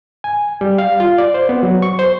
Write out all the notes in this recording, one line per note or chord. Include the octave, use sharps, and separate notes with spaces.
G#5
G3
F5
F4
D5
C5
B3
F#3
C#6
C5